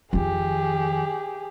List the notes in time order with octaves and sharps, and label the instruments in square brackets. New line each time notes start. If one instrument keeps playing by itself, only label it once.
[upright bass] F2 D#3 [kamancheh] G4 G#4